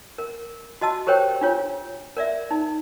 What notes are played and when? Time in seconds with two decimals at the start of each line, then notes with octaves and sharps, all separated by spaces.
0.18 A#4
0.81 F#4 D#5 A5 E6
1.07 G4 A#4 C5 C#5 G5
1.41 D4 F4 C#5
2.17 A#4 D5 E5
2.51 D#4